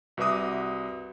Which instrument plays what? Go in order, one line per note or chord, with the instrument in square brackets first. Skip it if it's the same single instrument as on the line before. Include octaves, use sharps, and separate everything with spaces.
[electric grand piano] C2 F#4 B4 E5 D6 D#6